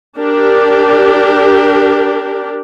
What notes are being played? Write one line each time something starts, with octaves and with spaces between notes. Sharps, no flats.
D4 G4 A#4